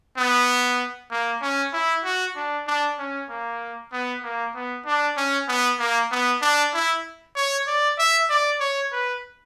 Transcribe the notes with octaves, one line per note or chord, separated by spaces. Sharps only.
B3
A#3
C#4
E4
F#4
D4
D4
C#4
A#3
B3
A#3
B3
D4
C#4
B3
A#3
B3
D4
E4
C#5
D5
E5
D5
C#5
B4